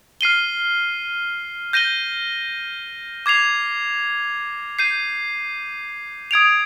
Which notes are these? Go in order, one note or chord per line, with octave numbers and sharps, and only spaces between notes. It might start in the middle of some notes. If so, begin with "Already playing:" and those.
F6 C7 D#7 G7
G6 A#6 D#7 G7
D6 G#6 C7 F7
G6 C7 D#7
D#6 G#6 D7 F7